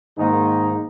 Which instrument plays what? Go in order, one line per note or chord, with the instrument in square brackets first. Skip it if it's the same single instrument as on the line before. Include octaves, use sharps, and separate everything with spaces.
[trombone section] G#2 D#3 A#3 D#4